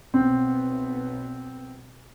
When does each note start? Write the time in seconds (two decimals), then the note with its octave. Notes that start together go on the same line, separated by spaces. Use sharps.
0.14 B1 B3 C4